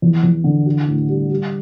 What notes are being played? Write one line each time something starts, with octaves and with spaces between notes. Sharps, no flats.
E2
E2
D3
F#4
A2
G3
G3